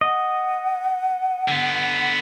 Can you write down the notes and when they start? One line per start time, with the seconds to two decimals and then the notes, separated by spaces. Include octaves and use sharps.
0.01 D#5 F#5
1.48 D3 B3